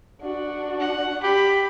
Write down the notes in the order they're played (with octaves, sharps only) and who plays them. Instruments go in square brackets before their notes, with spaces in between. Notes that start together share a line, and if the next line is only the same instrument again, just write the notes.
[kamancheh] D4 F#4
[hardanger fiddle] F#5
[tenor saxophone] G4 [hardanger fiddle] B5